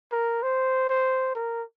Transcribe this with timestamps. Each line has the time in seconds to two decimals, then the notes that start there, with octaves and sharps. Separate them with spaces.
0.12 A#4
0.43 C5
0.89 C5
1.35 A#4